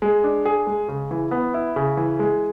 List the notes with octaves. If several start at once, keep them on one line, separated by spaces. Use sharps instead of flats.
G#3
D4
G#4
G#3
C#3
E3
B3
E4
C#3
E3
G#3